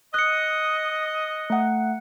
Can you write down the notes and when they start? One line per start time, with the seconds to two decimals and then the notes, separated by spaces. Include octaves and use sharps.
0.14 D#5 F#6 C#7
1.50 A3 F#5